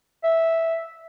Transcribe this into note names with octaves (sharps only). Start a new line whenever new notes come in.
E5